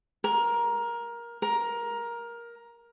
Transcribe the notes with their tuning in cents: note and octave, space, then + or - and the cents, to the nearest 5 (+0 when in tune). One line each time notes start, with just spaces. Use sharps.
A#4 +15
A#4 +15